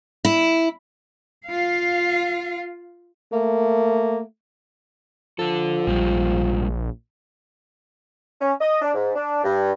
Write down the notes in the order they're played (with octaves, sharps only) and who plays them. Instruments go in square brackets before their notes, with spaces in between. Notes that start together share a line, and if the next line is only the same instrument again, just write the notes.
[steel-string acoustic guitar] E4
[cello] F4 F5
[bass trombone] A3 [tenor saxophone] A#3
[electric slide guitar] D3 A4 [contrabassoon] F3
[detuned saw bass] A#1 [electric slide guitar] A#2 G3 G#3
[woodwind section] C#4
D#5
D4
G#2
D4
G2